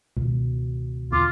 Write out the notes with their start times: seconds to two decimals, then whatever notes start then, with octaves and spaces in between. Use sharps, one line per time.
0.17 C#2 B2 D#3
1.12 E2 D3 F4 D6